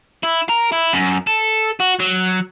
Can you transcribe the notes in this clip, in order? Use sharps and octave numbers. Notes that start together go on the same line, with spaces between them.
E4
A#4
E4
F#2
A4
F#4
F#3